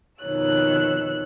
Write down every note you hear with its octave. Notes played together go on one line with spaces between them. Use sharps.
F2 B2 D#3 C#5 E6 F#6